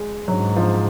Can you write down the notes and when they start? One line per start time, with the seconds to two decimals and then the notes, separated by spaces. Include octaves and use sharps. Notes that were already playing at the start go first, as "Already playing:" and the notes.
Already playing: G#3
0.28 G#2 F#3
0.56 F3